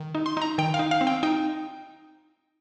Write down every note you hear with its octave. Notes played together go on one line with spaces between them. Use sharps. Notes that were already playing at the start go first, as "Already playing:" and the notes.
Already playing: D#3
D#4
C6
D#4 A#5
D#3 G5
F5
D#4
F5
C4
G5
D#4 G5